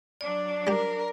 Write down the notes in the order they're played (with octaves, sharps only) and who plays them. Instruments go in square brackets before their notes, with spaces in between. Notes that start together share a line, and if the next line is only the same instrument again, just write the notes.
[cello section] F#3 D4 [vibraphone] D5
[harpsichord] G3 G4 [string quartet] A#4